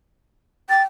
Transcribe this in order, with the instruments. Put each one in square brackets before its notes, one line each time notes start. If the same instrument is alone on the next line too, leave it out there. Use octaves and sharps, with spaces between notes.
[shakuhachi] G5 [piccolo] A6